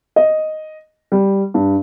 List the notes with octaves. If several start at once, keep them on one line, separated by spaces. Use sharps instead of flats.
D#5
G3
G2